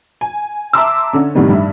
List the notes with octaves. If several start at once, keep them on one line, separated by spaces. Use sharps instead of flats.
G#5
E5 A5 A#5 C6 D6 E6
D3 C#4
A2 C3 D#3 G3 B3
G2 E5